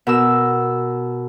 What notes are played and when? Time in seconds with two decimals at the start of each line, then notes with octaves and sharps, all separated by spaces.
0.07 B2 A#4 E6